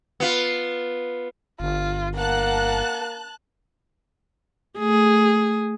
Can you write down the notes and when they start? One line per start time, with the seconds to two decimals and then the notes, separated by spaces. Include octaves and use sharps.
0.20 B3 F4
1.60 G1 F4
2.17 A#3 F#5 A5 F#6
4.79 A3 G#4